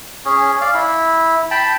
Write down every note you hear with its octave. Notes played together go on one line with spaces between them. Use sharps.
C#4 G#4
D5 F5
E4
G5 A5 B5